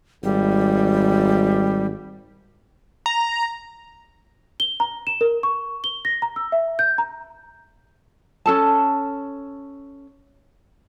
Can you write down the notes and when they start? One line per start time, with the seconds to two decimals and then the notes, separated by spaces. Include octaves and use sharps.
0.24 G#1 G3
3.06 A#5
4.60 G7
4.80 A#5
5.07 E7
5.21 A#4
5.43 C#6
5.84 G7
6.05 A#6
6.22 A#5
6.36 E6
6.52 E5
6.79 G6
6.98 A#5
8.46 C#4 A4 A5